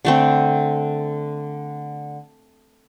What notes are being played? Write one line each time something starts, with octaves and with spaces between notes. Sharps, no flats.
D3 A3 C4